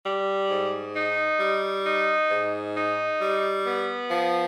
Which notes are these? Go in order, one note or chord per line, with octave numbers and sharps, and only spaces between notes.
G3
G#2
D#4
G3
D#4
G#2
D#4
G3
B3
F3